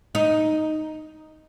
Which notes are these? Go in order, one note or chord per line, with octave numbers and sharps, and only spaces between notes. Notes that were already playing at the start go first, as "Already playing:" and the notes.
D#4